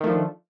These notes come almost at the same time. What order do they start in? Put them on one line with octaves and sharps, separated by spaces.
D#3 A3 F3 D4